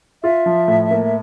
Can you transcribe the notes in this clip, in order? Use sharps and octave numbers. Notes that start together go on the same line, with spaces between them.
F4 E5
F3
A2
A#3